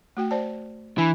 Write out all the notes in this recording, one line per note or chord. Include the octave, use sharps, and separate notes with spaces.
A3 F#4 G5
C5 D5 A5
E3 D4 G#5 B5